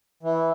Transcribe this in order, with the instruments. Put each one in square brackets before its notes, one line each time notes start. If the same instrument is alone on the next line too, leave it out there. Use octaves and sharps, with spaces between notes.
[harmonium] E3